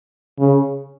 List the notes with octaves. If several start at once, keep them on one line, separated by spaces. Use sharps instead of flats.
C#3